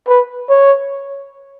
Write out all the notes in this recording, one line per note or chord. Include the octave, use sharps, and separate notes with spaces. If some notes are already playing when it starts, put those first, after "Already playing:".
B4
C#5